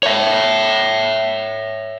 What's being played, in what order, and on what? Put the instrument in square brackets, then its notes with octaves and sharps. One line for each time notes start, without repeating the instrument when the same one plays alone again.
[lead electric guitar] C#5 E5